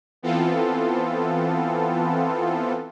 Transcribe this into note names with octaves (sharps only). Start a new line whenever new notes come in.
E3 B3 C4 F4 A4